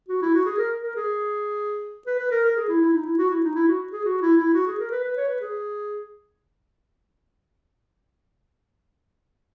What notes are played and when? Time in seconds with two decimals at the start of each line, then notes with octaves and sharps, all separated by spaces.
0.09 F#4
0.22 E4
0.34 F#4
0.46 G#4
0.58 A#4
0.83 A#4
0.96 G#4
2.07 B4
2.19 B4
2.31 A#4
2.45 A#4
2.57 G#4
2.69 E4
2.82 E4
2.93 D#4
3.06 E4
3.18 F#4
3.31 E4
3.44 D#4
3.56 E4
3.68 F#4
3.93 G#4
4.05 F#4
4.22 E4
4.38 E4
4.54 F#4
4.67 G#4
4.79 A#4
4.91 B4
5.03 B4
5.17 C#5
5.28 B4
5.41 G#4